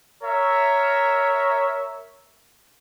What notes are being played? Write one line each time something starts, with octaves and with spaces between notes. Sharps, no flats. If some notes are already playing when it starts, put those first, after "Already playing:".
A#4 C#5 E5